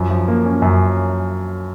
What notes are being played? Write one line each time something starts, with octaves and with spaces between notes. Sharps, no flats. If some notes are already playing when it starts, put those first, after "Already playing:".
Already playing: F#2 F3
F3
A#3
C#4
F#2